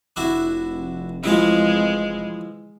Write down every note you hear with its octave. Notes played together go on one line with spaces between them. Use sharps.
F1 D4 E4 F#4
E3 F3 G#3 F4